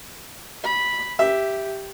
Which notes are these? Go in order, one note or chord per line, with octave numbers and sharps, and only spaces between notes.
B5
G4 E5